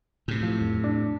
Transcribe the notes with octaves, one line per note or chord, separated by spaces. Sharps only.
A2 C3
F3
F2
D4